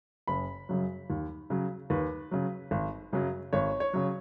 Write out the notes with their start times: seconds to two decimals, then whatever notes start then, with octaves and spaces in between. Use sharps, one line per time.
0.27 F#1 B5
0.69 F#2 C#3 F#3
1.10 D#2
1.50 C#3 F#3
1.90 D#2 B4
2.31 C#3 F#3
2.71 G#1
3.13 F#2 C#3 F#3
3.53 G#1 C#5
3.80 C#5
3.93 C#3 F#3